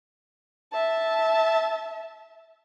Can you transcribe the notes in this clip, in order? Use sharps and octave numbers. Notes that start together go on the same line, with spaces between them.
E5 A5